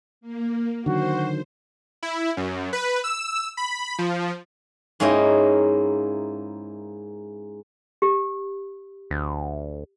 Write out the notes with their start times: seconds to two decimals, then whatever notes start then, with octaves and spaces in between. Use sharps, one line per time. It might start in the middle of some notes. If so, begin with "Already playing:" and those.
0.21 A#3
0.86 D3 D#3 F#3 F#4 C5
2.03 E4
2.37 F#2
2.73 B4
3.04 E6
3.57 B5
3.98 F3
5.00 G#2 A#3 C#4 E4 D#5 G5
8.02 G4
9.11 D2